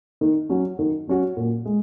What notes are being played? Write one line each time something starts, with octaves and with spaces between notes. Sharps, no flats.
D#3
F#3 C#4 F#4
D#3
F#3 C#4 F#4
A#2
G#3